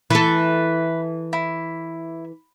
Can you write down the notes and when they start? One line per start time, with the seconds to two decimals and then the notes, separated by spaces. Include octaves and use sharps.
0.10 E3 A4 B4
1.33 E4